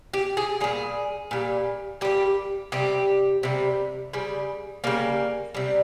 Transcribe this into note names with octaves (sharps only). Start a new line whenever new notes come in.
G4
G#4
A#2 G3 G#4
A#2 G3
A#2 G3 G4
C3 G3 G4
C3 G3
C#3 G3
C#3 G3 A#3
C3 G3